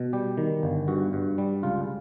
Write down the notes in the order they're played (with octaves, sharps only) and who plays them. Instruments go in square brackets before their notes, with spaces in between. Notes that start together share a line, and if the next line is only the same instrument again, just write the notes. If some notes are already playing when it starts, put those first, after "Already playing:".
Already playing: [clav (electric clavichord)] B2
G3 G4
D#3
G1
G2 F#4
G2
G3
C#2 F4